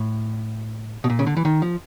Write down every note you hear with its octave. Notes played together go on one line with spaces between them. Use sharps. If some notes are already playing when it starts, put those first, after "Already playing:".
Already playing: A2
B2
A#2
C#3
D3
E3
D#3
F3